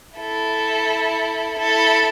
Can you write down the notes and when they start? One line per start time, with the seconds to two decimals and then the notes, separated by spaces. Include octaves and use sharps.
0.18 E4 A4
1.57 E4 A4